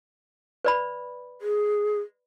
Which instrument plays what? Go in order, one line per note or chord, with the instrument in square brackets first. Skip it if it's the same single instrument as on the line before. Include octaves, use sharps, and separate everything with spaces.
[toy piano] B4 D5 B5
[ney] G#4